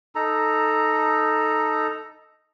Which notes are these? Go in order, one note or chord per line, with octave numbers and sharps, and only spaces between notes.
D#4 A4 A#5